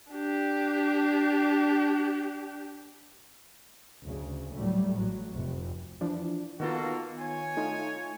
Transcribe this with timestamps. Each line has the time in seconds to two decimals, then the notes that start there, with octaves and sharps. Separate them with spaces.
0.11 D4 G4
4.03 D2 C#3
4.54 A2 F#3 G3 A3
4.95 A1 A2 F#3
5.31 F1 C3
6.01 E3 F3 D4
6.60 D#3 A#3 B3 F4 F#4 A4
7.19 C#5 G#5
7.57 A3 D#4 F4